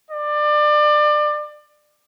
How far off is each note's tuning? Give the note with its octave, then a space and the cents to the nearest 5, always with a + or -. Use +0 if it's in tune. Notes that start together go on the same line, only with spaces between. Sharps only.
D5 +25